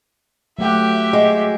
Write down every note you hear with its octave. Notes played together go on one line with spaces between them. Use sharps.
F#3 A3 G4 E5 F#5
G#3 F#4